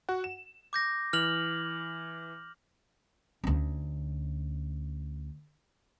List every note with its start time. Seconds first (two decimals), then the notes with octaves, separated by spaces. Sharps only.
0.09 F#4 F#5
0.24 E7
0.73 D6 G6 A#6
1.13 E3 F6 F7 F#7
3.44 D2 C#4